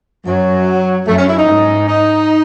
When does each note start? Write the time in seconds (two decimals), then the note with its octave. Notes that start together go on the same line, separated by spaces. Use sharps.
0.25 F#2 F#3
1.06 F#2 A3
1.17 C#4
1.27 E4
1.37 D#4
1.47 G#2
1.87 D#4